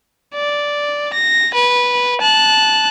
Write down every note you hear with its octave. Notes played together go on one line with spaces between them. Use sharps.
D5
A#6
B4
A5 F#6